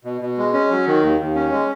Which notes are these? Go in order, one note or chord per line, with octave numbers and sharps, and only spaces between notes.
B2
B2
G#3
C#4
F#3
D#3
D#2
D#2
C#4
G#3